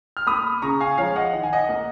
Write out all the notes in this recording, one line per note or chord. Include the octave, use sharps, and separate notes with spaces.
F6
A#3 B5 D#6
C#3 A#5 C#6
F5 G#5
F3 G#3 C#5 F5
D#5 F#5
D#3 F#5
G#5
D#5 F#5
A#3